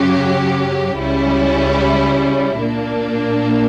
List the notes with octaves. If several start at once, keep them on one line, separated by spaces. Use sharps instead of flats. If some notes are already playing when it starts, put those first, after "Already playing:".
Already playing: F#2 C#3 F#3 C#4 G4
C#2 C#3 G3 C#4 E4
A#2 A#3 D4